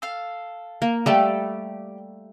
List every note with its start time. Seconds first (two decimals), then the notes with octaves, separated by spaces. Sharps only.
0.02 A4 F5
0.82 A#3
1.06 G3 A3 G4 A4